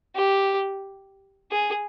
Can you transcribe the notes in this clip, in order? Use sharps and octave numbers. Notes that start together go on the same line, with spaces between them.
G4
G#4